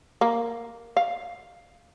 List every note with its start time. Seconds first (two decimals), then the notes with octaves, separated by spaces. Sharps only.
0.21 A#3
0.97 F5